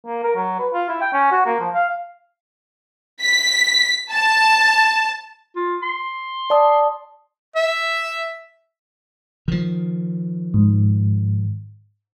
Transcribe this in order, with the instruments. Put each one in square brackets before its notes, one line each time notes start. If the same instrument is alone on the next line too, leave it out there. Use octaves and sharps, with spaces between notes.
[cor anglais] A#3
A#4
F#3
B4
F4
E4
G5
C#4
F#4
A#3
F3
F5
[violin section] B6
A5
[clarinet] F4
C6
[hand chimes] D5 A5 D#6
[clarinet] E5
[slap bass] D#3 F3
[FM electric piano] G#2